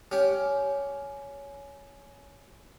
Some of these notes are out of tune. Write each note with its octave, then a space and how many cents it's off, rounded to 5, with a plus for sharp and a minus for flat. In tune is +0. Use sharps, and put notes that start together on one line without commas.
C#4 +15 G4 -5